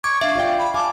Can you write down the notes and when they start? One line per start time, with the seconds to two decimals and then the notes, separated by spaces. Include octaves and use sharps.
0.04 C#6 D6 G#6
0.21 D4 E5 F5
0.35 F4 D5 G5
0.58 B5
0.74 F5 G#5 A5 D6